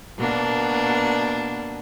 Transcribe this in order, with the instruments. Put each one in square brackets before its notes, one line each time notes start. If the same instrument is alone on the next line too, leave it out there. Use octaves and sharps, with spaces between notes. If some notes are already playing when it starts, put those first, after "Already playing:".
[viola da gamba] B2 A#3 D4